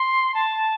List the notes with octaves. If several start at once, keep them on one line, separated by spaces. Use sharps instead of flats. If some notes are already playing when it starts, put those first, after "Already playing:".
Already playing: C6
A5